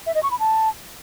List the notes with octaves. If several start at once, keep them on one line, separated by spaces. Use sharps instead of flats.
E5
D#5
C#6
B5
A5